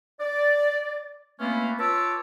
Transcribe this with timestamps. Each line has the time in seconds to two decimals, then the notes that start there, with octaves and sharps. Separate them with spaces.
0.20 D5
1.40 A3 A#3 C4 C#4 F4 B4
1.79 F4 B4 C#5 A5 D6 E6